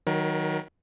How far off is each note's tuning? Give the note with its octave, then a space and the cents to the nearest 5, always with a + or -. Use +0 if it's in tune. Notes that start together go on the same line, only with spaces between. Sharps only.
D#3 +0 F#3 +0 A#4 +40